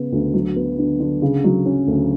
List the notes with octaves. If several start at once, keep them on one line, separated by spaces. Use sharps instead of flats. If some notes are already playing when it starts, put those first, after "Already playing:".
Already playing: C#3 B3
D2
F#3
B3
D3
D3
C#3
F#3
C#4
D2